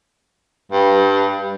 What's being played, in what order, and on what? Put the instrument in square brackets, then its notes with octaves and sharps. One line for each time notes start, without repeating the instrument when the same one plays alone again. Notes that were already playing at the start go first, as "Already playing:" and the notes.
[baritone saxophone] G2